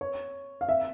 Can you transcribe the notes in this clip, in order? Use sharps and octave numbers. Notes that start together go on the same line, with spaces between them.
C#5
F5
E5